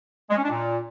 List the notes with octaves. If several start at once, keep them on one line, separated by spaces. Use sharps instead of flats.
G#3
C#4
D4
A#2